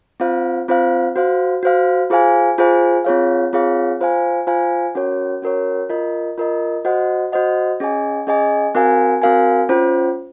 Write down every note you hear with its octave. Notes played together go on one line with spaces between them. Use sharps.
C4 F4 C5 F5
C4 F4 C5 F5
F#4 C5 F5
F#4 C5 F5
F4 G#4 C5 F5 G#5
F4 G#4 C5 F5 G#5
C4 F4 G#4 C#5 F5
C4 F4 G#4 C#5 F5
F4 C5 F5 G#5
F4 C5 F5 G#5
C#4 F#4 A#4 C#5
C#4 F#4 A#4 C#5
F4 A#4 D#5
F4 A#4 D#5
F#4 C5 D#5 F#5
F#4 C5 D#5 F#5
C#4 G#4 D#5 G#5
C#4 G#4 D#5 G#5
C4 F#4 A#4 F5 G#5
C4 F#4 A#4 F5 G#5
C#4 F4 C5